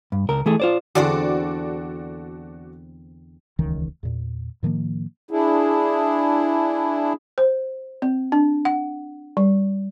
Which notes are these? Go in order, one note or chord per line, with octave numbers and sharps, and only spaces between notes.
G2
C#2 A#4
E3 A3 G#4
F4 C5 D5
E2 D3 C4 F#4 A4 D5
D#1 C#2 D#3 E3
E2 A#2
A2 D#3 F3 A#3
D4 E4 G#4
C5
C4
D4
F#5
G3